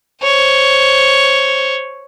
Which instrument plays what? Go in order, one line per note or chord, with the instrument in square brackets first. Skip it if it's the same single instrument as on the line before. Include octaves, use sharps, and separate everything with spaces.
[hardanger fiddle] C5 C#5